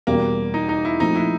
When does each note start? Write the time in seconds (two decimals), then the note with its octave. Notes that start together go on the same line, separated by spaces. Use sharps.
0.07 E2 B2 G3 A#3
0.54 D#4
0.69 D#4
0.85 E4
1.00 A#2 F3 A3 C4 D#4
1.16 E4